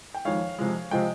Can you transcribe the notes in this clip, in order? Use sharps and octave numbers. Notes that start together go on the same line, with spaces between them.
G5
F2 D#3 G#3 C#5 F5
F2 C3 F3 G#3
C3 F3 G#3 D#5 G5